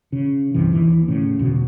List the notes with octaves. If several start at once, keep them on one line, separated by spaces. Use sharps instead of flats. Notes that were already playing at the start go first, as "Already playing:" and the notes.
C#3
C2 G2 C3 E3
D#2 E3
A2 C#3
E1 D2 B2